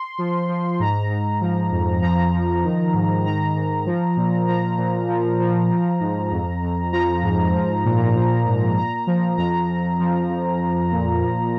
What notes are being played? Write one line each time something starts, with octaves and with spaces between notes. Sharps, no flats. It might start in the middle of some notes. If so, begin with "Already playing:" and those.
Already playing: C6
F3
F3
G#2 A#5
G#2
F3
F2
F3 A#5
F3
D#3
G#2
D#3 A#5
G#2
F3
A#2
F3 A#5
A#2
F3
F3
F3
G#2
F2
F2
F3 A#5
G#2
F3
A#2
F3
G#2
A#2 A#5
F3
F2 A#5
F2
F3
F2
F3
A#2
F3